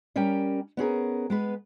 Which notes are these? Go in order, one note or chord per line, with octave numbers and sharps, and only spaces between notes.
G3 C#4 A#4 G5
B3 C#4 G#4 A#4
G#3 B3 B4